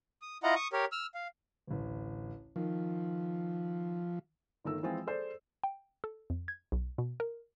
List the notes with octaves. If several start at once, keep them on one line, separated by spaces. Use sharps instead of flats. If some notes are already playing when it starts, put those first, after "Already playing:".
D#6
E4 F4 D#5 F#5 A#5
C#6 D#6
G4 A#4 C#5
E6 F6
F5
A1 D2
D#3 F3
G1 D#3 A3 A#4 E6
E3 F3 G#3 C4 F4
G#4 A4 C5 D5
G5
A4
F2
G#6
B1
B2
A#4